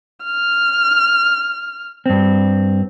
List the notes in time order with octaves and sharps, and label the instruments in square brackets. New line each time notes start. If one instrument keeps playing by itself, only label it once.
[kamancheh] F6
[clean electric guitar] G2 C4